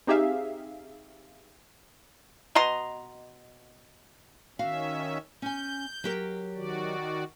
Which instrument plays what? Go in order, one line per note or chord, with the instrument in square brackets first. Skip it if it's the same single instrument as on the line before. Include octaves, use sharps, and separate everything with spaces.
[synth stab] C4 D#4 G4 G#4 E5 F5
[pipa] B2 D#5 A#5 C6
[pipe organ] D#3 C#4 E5 [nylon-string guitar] F#4 F5
[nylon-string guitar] C#4 G#5 [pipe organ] G6
[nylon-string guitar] F#3 G4 A#4
[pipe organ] D#3 F#4 D5